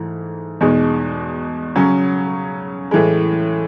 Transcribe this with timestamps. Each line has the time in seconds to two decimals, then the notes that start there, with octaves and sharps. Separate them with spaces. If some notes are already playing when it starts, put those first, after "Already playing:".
Already playing: G#2 E3 A3
0.61 E2 B2 G#3 D#4
1.76 C#3 F#3 C#4
2.91 A2 E3 G#3